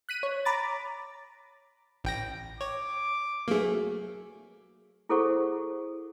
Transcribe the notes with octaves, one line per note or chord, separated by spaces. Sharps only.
F#6 B6 D#7
C#5
A#5 B5 D6 A6
A1 G5 A#6
C#5 D6
F#3 A3 A#3 G#4
E4 G#4 A4 C5 F#5 C#6